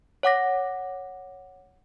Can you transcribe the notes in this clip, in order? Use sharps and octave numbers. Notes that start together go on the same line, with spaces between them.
C#5 F#5 D6 A#6